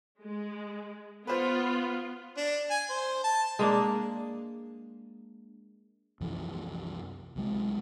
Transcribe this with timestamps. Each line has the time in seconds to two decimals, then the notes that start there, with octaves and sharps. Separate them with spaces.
0.22 G#3
1.27 B3 F4 B4 C5
2.37 D4
2.70 G#5
2.90 C5
3.24 A5
3.59 G#3 A#3 D4
6.20 C2 F#2 E3 F3
7.36 C2 F#3 G#3